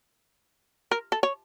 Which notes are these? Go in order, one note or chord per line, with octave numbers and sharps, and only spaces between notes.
A#4
A4
C#5